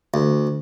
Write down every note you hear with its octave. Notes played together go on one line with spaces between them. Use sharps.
D2